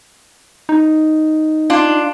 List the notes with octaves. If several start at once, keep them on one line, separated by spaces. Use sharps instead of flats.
D#4
D4 F4